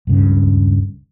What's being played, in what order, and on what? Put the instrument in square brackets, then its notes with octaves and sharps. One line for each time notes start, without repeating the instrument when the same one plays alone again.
[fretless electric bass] D#1 C#2 G2 C#3